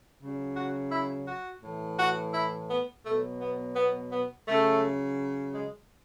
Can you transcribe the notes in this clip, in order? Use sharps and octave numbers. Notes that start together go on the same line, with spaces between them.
C#3 F#3
F#4
E4
F#4
A2 E3
F#4
E4
B3
B2 F#3 A3
B3
B3
B3
C#3 F#3 A3
G#3